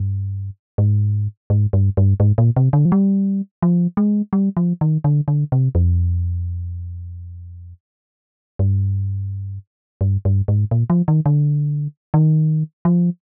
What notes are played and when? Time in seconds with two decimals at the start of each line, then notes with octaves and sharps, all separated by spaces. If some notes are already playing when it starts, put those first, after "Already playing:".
Already playing: G2
0.78 G#2
1.50 G#2
1.73 G2
1.97 G2
2.20 G#2
2.38 A#2
2.56 C3
2.73 D3
2.85 F3
2.92 G3
3.62 F3
3.97 G#3
4.33 G3
4.57 F3
4.81 D#3
5.04 D3
5.28 D3
5.52 C3
5.75 F2
8.59 G2
10.01 G2
10.25 G2
10.48 G#2
10.71 A#2
10.90 F3
11.08 D#3
11.26 D3
12.14 D#3
12.85 F3